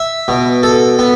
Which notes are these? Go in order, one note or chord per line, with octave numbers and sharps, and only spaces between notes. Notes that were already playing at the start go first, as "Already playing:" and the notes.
Already playing: E5
B2
A4
B3